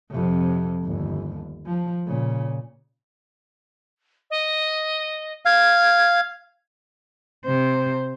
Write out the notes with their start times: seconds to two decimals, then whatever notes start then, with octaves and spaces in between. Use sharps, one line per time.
0.11 F2 C3
0.84 G1 D#2
1.66 F3
2.07 A#2 C#3
4.30 D#5
5.45 F5 G#6
7.46 C3 C5